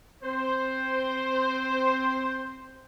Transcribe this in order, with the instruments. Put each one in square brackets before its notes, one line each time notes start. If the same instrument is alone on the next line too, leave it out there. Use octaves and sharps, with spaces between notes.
[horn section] C4 C5